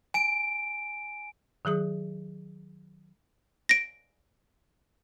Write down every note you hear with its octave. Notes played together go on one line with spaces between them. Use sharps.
G#5 D7
D#3 F#3 G#4 D#6
A#6 D7